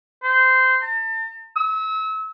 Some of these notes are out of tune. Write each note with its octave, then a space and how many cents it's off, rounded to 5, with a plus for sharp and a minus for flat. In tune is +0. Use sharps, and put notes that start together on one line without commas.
C5 -15
A5 +40
E6 -35